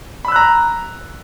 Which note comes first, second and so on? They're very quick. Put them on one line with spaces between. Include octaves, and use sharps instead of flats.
B5 E6 F#6 A#5